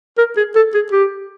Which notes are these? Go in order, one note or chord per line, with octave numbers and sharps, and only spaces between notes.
A#4
G#4
A4
G#4
G4